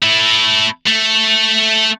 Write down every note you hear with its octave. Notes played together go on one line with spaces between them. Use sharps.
A3 E4
A3